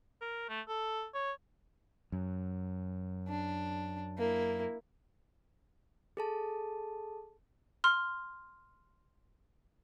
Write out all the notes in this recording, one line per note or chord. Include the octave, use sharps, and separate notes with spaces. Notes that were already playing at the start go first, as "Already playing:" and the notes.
A#4
A3
A4
C#5
F#2
D4
A#3 E4
G#4 A4 A5
C6 F6